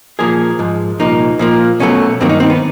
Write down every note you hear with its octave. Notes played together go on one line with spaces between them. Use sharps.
A#2 F3 A#3 G#4
G#2 F3 G#3
C2 A#2 F3 A#3 D#4
A#2 F3 A#3
B1 B2 F#3 A3 C#4
G2 D#3 F#3 A#3 C4
D#4
C4
B3